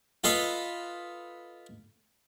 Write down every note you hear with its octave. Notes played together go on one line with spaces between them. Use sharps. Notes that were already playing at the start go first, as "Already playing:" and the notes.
F4 A4 B4 D#5